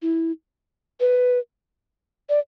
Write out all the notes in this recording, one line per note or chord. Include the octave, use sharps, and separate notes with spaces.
E4
B4
D5